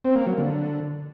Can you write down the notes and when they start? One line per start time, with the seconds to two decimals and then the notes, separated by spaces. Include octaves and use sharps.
0.05 C4
0.16 A#3
0.27 F#3
0.38 D3